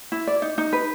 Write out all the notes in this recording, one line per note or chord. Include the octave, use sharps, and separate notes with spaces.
E4
D5
D#4
D#4
B4